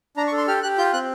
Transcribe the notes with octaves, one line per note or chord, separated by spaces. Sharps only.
D4 A#5
C#6
A4
C6
G4 F6
G4 F#6
F4 G6
C4 F#6